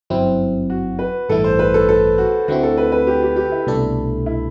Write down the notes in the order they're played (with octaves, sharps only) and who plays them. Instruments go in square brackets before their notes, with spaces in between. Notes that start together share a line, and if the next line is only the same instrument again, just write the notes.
[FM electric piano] G1 F#2 F#3 C4 E4
[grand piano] F#4
B4
[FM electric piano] A1 G2 E3 A3 E4 [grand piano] A4
[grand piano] C5
B4
A4
A4
F#4
[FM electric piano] D2 D3 A3 C4 E4 [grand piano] F#4
[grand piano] A4
B4
B4
G4
G4
G4
E4
[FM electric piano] C2 B2 A3 D4 A4
[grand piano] E4